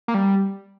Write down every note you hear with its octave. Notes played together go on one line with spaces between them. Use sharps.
A#3
G3